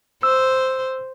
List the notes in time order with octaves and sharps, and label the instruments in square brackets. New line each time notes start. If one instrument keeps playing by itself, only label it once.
[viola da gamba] C5 [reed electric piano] E6